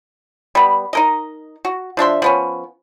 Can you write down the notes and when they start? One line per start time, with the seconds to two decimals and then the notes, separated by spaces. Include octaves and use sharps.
0.55 G3 B3
0.93 D#4 A#4 D#5
1.65 F#4
1.97 F3 D4 E5 C6
2.22 F3 B3 C#4